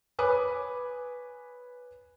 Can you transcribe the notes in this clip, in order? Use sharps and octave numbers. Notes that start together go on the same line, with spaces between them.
B4 C#5 G#5 D6 D#6 F#6